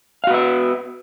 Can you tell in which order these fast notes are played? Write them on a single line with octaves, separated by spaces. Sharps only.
F5 F#4 B3 E5